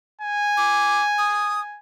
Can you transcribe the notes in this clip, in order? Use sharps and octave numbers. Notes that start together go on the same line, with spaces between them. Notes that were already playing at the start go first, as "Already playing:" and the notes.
G#5
D6
D#6